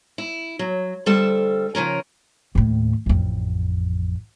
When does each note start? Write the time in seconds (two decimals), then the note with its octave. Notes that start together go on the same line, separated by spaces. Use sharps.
0.18 E4
0.59 F#3
1.06 D2 G3 A4 C5 E5
1.75 C#3 F3 C#4 A#4
2.55 D#2 A2
3.06 A1 F2